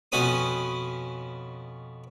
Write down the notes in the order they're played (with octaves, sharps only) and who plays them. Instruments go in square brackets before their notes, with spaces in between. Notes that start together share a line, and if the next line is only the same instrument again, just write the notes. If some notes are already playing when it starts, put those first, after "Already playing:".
[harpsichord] F2 B2 C#4 B4 B5 D#6